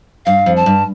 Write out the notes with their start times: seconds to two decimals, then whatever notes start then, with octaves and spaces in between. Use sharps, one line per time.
0.26 G2 F5
0.46 F2
0.57 A5
0.66 G2